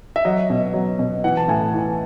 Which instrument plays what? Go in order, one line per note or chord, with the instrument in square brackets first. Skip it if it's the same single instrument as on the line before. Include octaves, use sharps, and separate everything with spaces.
[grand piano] E5
F#3 D#5
B2
F#3
B2
E3 F#5
A5
A2 G#5
E3